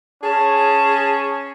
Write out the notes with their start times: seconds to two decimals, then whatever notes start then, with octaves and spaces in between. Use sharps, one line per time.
0.23 C#4 G#4 A5